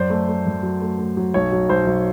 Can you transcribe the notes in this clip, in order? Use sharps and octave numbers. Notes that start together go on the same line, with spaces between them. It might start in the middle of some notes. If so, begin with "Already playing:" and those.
Already playing: F#2 C5 D5
A3
A3
F#2
F#3
A3
A3
F#3
B1 C#5
F#3
B1 C5
B1